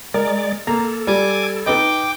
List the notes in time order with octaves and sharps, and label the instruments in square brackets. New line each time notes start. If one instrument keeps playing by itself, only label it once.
[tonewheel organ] G#3 D5 [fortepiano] A#4
[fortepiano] A#3 A#5 [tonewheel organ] A4
[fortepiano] G3 [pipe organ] G#5 D6
[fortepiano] D#4 B4 D#5 [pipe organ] G5 D6